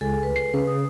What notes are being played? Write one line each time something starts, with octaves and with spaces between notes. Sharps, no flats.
C#2 G#4 A4 G#5
B4
C7
C#3 B4
D#6